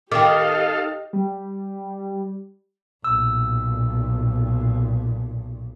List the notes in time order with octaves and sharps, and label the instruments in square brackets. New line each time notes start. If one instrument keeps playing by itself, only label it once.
[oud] D#3 [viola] G4 D#5 [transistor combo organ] A4 F5 [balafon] G5 D6
[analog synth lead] G3
[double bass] B1 A#2 [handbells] E6